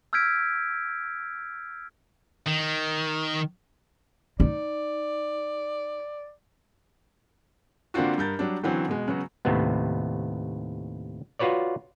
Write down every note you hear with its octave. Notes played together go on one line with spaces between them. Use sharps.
E6 F6 G6 G#6 B6 D7
D#3
D#4 D5
D3 A#3 C4 D4 F4 F#4
G2 A#4 G6 A6
F#3 G3 D4
D3 E3 F#3 C4 C#4
B2 G#3
C#3 F#3 B3 F#4
D#2 A2 C3 B3
F4 F#4 B4 C#5 D5